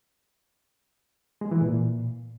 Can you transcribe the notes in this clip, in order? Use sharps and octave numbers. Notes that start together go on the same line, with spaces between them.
G#3
E3
A#2